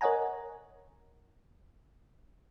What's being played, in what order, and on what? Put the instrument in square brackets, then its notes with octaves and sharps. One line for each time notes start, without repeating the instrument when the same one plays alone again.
[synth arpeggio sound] A#4 C#5 D#5 F#5 G#5 A#5